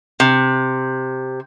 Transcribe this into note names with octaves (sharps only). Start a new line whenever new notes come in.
C3